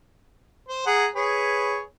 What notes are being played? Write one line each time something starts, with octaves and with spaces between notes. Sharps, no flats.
C5
G#4 F#5 A#5
G#4 B4 C#5